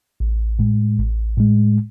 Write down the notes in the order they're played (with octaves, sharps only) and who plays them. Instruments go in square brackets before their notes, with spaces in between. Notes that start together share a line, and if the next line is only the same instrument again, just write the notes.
[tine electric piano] A1
A2 G#3
A1
A2 G#3